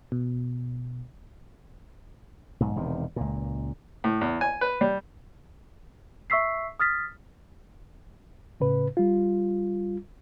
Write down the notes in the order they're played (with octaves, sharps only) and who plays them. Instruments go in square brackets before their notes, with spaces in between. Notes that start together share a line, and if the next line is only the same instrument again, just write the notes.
[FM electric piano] B2
[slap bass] B1 G#2
E1 C3 D#3
C#2 A#2
[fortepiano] A2
E2
G#5
B4
G3
[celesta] E5 C#6 E6 B6 C7
D#6 F6 A6 B6
[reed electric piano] A2 C#3 B4
G3 F4